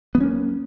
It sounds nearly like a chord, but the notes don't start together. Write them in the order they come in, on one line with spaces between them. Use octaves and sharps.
B3 F#3 C#4 A#3